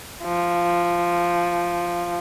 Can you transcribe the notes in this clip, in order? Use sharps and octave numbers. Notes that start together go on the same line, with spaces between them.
F3